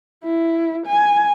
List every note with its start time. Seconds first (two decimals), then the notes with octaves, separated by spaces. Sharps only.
0.24 E4
0.86 G#5